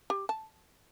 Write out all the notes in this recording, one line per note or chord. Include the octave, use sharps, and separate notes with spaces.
G4
A5